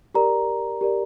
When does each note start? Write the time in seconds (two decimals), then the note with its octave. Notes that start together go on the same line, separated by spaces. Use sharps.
0.15 G4 A#4 D5 A#5
0.81 G4 A#4 D5